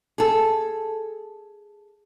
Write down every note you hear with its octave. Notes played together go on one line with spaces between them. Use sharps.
G#4 A4